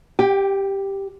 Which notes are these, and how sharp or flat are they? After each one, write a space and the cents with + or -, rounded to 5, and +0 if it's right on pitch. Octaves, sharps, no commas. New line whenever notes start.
G4 +0 G5 +30